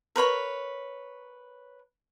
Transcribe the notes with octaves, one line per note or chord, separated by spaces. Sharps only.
A#4 B4 C#5 B5